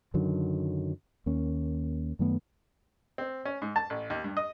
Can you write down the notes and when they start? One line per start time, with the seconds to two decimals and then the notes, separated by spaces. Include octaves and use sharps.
0.14 F#2 D3 D#3 F#3
1.26 D#2 A#3 C#4
2.19 F#2 D#3 A3 B3
3.18 C4
3.45 C#4
3.62 G#2
3.76 A5
3.90 A1
4.10 D#2
4.24 G2
4.37 D#5